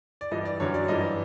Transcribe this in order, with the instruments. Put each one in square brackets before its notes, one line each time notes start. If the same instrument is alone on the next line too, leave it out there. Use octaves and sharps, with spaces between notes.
[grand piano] D5
G2 E3 D#5
D5
F#2 D3 F#3 C#5
D5
G2 E3 D#5